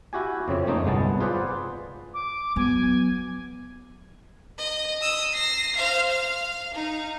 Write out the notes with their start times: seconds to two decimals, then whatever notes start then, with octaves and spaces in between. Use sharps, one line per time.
0.13 E4 F#4 G4 G#5
0.48 F2 C#3 C4 C#5
0.66 F2 A3 A#3 D#4
0.84 G1 C2 G#3 B3 A5
1.20 F4 G#4 B4 C5 D5 F#5
2.13 D6
2.56 F#3 B3 G#5
4.58 D#5
5.01 D#6 E6
5.34 A#6 C7
5.76 C5 F5
6.10 F5
6.74 D#4